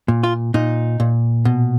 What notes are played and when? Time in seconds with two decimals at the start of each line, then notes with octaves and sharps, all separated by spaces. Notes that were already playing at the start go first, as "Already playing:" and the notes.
0.08 A#2
0.23 F4
0.54 A#2 D#4
1.00 A#2
1.45 B2